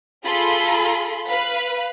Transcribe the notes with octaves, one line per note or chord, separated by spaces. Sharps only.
F4 G#4 A4 B5 C6
B4 F5 B5